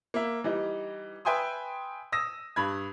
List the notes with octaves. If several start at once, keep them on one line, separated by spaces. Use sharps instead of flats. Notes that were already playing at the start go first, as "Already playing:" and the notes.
A#3 E5
E3 G3 D#4
B4 E5 G5 G#5 C6 D#6
D#6 E6 A#6
G2 B5 G#6